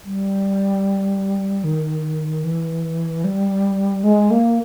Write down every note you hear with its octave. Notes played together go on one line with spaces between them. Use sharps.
G3
D#3
E3
G3
G#3
A#3